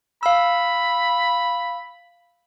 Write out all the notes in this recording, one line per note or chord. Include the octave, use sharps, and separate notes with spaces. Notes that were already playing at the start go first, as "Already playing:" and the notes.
F5 B5 E6